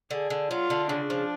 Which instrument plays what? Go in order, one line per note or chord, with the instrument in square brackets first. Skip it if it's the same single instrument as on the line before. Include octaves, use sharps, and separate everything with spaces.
[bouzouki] D3 [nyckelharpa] G#4
[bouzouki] D3
[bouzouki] F#3 [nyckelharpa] F4
[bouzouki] D3
[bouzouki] C#3 [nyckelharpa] D4
[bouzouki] F3